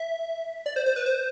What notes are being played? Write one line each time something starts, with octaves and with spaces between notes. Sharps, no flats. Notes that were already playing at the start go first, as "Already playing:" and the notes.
Already playing: E5
D5
C5
C5
B4
C5